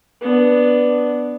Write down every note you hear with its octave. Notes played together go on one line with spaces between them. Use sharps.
B3 D4